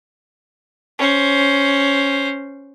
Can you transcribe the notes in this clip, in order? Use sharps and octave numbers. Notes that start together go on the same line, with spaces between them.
C#4 C5